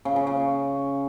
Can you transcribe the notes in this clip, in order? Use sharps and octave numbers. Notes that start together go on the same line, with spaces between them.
C#3
C#3
C#3